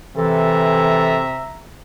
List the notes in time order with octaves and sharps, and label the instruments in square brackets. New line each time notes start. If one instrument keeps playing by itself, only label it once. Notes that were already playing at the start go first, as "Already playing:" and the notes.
[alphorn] C3 [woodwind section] E3 A4 [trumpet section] E5 A#5